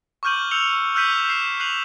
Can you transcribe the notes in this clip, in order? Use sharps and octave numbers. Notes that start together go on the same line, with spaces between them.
C#6 D6 F6 G6 D#7 F#7
E6 C#7 F7 G7
E6 F6 G6 B6 D#7 F#7
B6 E7
C7 E7
F#6 C7 D#7 F7 F#7